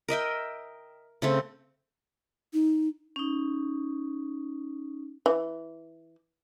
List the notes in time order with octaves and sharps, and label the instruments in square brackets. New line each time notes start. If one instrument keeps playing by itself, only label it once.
[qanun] A#4 D#5 E5 G5
C#3 A3 C4
[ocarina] D#4
[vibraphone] C#4 D#4
[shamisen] E3